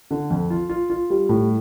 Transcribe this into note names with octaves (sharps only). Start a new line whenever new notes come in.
D3
F2
F4
F4
F4
G3
A2